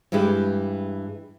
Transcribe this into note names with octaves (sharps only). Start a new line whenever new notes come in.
G2 E3 G#3 E4 G4